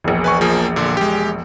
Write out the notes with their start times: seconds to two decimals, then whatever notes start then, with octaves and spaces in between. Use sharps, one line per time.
0.04 E1 A#1
0.24 B4 G#5 C#6
0.41 F3 A#3 G#4
0.76 A#2 D3
0.97 G#3 G4